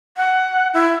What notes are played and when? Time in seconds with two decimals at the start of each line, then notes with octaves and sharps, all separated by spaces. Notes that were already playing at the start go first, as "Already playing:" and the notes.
0.17 F#5
0.74 E4